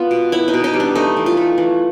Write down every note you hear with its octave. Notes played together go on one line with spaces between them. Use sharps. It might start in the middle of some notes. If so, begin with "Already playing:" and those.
Already playing: B3 F4
B2
B3 E4
D#4
B2
D#4
G3
D4
A3 D#4
E3
F4
A3
E3